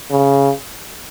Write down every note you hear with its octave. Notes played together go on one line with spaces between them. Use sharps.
C#3